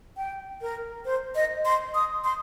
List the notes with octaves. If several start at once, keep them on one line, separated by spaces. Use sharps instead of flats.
G5
A#4
C5
D#5
C6
D#6
C6